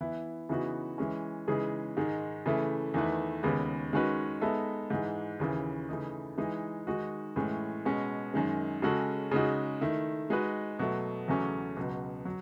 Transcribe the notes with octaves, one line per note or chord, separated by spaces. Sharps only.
E3 B3 E4
C#3 E3 B3 D#4 F#4
E3 G#3 C#4
C#3 E3 G#3 D#4 G#4
G#2 D#3 G#3
C#3 E3 A3
E2 D#3 A3 E4 B4
D#2 C#3 G#3 B3
D#3 G#3 C#4 F#4 B4
G#3 B3 D#4 A4 E5
G#2 E3 G#3
D#2 C#3 E3
C#3 E3 A3 D#4
E3 G#3 D#4
D#3 G#3 D#4 F#4
A2 E3 G#3 C#4
B2 G#3 C#4
F#2 D#3 G#3
C#3 G#3 C#4 F#4 A4
C#3 G#3 D#4 F#4
D#3 A3 E4
G#3 D#4 F#4 B4 D#5
B2 F#3 A3
E2 C#3 F#3 A3 C#4
C#2 B2 F#3
F#3